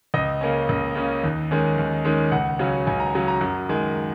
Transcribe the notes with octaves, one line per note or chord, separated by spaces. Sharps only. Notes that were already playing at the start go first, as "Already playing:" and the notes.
C#2 D#5
C#3 A#3 C#4
C#2
C#3 A#3 C#4
D#2
D#3 G#3 C#4
D#2
D#3 G#3 C#4
C#2 F#5
C#3 F#3 C#4
C#2 G#5
A#5
C#3 F#3 C#4
A#5
F#2
D#3 G#3